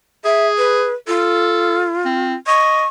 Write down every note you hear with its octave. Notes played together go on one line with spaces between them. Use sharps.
G#4 E5
B4
F4 A4
C4
D#5 C#6